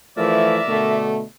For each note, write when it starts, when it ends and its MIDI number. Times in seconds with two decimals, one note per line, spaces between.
0.17 0.58 52
0.17 0.58 53
0.17 0.58 57
0.17 1.04 70
0.17 1.04 74
0.17 1.04 76
0.68 1.22 47
0.68 1.22 50
0.68 1.22 57